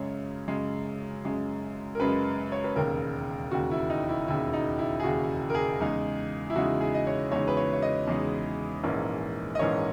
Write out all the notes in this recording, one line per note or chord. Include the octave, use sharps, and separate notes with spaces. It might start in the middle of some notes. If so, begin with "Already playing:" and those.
Already playing: F#2 C#3 G#3 C#5
F#2 C#3 G#3
F#2 C#3 G#3
A#4
F#2 C#3 G#3 B4
C#5
B4
E1 D#2 C#3 A#4
E1 D#2 C#3 F#4
E4
D#4
E4
E1 D#2 C#3 E4
D#4
E4
G#4
E1 D#2 C#3 F#4
A#4
G#4
E2 C#3 G#3 D#4
E4
E2 C#3 G#3 D#4 F#4
G#4
D#5
C#5
E2 C#3 G#3 D#4 C#5
B4
C#5
C#5
D#5
E2 C#3 G#3 D#4
A#1 G#2 E3 A#3 C#4
D#5
A#1 G#2 E3 A#3 C#4 C#5